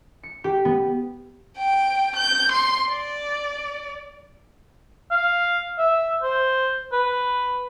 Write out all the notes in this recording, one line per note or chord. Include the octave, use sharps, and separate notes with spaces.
C#7
G4
B3
G5
G6
C6
D5
F5
E5
C5
B4